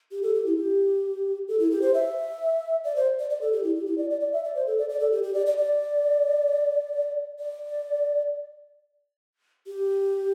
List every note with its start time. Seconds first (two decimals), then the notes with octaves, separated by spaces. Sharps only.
0.12 G4
0.23 A4
0.35 G4
0.46 E4
0.57 G4
1.48 A4
1.59 E4
1.71 G4
1.82 C5
1.94 E5
2.84 D5
2.96 C5
3.19 D5
3.30 D5
3.41 A4
3.53 G4
3.63 E4
3.75 G4
3.86 E4
3.98 D5
4.10 D5
4.21 D5
4.33 E5
4.44 D5
4.55 C5
4.67 A4
4.78 D5
4.89 D5
5.00 A4
5.12 G4
5.23 G4
5.34 D5
5.46 D5
5.58 D5
7.39 D5
9.67 G4